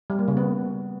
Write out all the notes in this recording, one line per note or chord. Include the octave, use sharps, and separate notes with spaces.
G3
A#3
C#3
B3